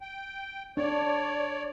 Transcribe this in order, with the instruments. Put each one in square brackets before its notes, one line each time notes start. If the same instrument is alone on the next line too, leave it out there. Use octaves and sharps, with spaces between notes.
[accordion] G5
[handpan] D4 [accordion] C#5 D5